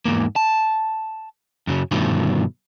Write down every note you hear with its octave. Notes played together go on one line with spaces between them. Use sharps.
E2 G#2 A#3
A5
F#2 C#3 E3 F#3
G2 B2 D3 D#3 F3 A3